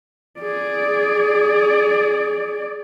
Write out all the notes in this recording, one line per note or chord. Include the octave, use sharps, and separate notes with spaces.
G#4 D5